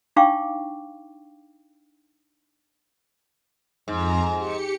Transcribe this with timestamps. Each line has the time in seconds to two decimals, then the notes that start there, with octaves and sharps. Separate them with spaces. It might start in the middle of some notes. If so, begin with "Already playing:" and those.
0.16 D4 D#4 F5 G5 C#6 D6
3.88 F2 G#2 A#5
4.37 G4 C#7